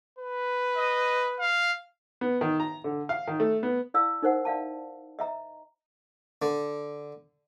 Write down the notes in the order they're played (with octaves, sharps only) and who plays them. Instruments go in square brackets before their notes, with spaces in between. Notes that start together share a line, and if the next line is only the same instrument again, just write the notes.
[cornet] B4
[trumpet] D#5
F5
[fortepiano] B3
D#3
A#5
D3
F5
D#3
A3
B3
[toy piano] E4 D5 F5 E6
D#4 A#4 C5 F#5
D5 E5 F5 A5
D#5 E5 A#5
[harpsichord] D3